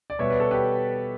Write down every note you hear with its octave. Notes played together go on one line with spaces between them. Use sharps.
D5
B2 G3 B3 C#5 E5
B4 D5
A4 C#5
G4 B4